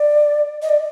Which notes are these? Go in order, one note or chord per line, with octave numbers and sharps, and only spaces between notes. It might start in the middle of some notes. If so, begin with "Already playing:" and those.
Already playing: D5
D#5
D5